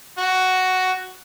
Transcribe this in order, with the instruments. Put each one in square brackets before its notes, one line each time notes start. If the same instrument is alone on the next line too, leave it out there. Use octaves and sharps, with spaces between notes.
[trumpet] F#4